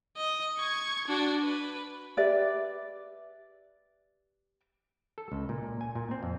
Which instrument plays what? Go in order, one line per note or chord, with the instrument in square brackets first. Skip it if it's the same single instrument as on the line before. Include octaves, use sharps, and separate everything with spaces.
[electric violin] D#5
C#6 G#6
D4 F#4
B4
[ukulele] G4 B4 D5 E5
[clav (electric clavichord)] A4
C#2
A#2
G#5
A#2
C4
F2